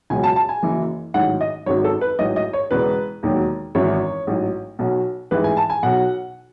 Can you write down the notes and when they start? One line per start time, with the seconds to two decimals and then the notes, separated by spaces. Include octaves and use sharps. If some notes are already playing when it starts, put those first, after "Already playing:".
0.10 C#2 B2 F#3 G#5
0.23 A5
0.36 A5
0.49 G#5
0.63 F#1 F#2 E3
1.14 A1 G#2 D#3 F#3 F#5
1.41 D#5
1.66 G#1 F#2 D#3 F#3 C#5
1.84 A4
2.01 B4
2.19 A1 G#2 F#3 D#5
2.36 D#5
2.53 C#5
2.71 E1 E2 C#3 G#3 B4
3.23 E1 D#2 D#3 F#3
3.75 G#1 F#2 E3 C#5
4.27 A1 G#2 F#3
4.79 B1 B2 F#3
5.31 A1 G#2 E3 G#3 B4
5.44 G#5
5.57 A5
5.70 G#5
5.83 B1 B2 F#3 F#5